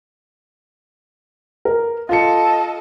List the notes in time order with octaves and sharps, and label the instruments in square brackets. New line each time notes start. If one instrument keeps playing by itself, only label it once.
[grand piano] A#4
[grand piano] F4 C#7 [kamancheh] A4 D#5